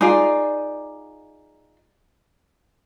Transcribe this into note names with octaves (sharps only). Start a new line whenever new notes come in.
D#4 F4 G#4 D5